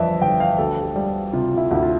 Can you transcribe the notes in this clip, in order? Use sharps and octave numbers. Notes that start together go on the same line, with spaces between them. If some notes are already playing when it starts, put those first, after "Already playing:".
Already playing: G1 F2 E3 D5 E5
G1 G5
F5
D2 A4
G4
G3
C3 F4
E4
D2 E4
F4